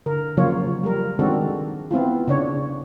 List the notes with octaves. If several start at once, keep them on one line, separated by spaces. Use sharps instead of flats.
D3 A#4
C#3 F3 F#3 A#3 F4 C#5
G3 A#4
D#3 G#3 C4 D4 F#4 A4
B3 C4 E4 F4
C#3 D4 C#5